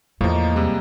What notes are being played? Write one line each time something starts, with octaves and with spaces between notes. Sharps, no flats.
E2 A2 F3 A#3 D#5
C3 G3 G#3